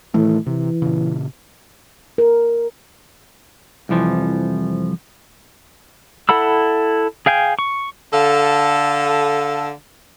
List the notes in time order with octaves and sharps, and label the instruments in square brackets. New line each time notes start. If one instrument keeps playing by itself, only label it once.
[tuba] A2 [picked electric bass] D#3 E3 A3
[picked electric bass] C3 [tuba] E3
[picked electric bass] A#2 C#3
[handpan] A#4
[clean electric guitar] C2 F2 E3 F3
[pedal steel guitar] E4 A4 F#5 B5 E6
G#4 F5 G5 G#5
C#6
[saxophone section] D3 A4 F5